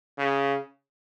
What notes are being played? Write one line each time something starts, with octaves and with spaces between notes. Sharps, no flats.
C#3